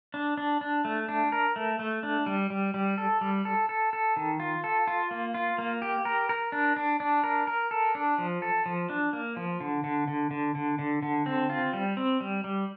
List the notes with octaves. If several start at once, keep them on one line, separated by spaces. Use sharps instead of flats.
D4
D4
D4
A3
D4
A#4
A3
A3
D4
G3
G3
G3
A4
G3
A4
A4
A4
D#3
F4
A4
F4
A#3
F4
A#3
G4
A#4
A#4
D4
D4
D4
A#4
A#4
A4
D4
F3
A4
F3
D4
A#3
F3
D3
D3
D3
D3
D3
D3
D3
C4
F4
G3
C4
G3
G3